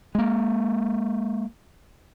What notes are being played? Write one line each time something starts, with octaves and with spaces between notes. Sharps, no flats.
G#3 A#3